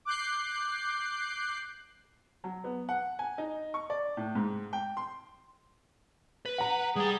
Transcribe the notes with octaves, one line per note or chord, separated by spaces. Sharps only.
D6 F#6 G6 C7
F#3
B3
F#5
G#5
D#4
C#6
D5
A2
G#2
G5
C6
B4
F#5 A#5
G3 G#4 G5